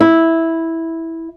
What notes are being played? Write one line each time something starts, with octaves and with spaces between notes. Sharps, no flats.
E4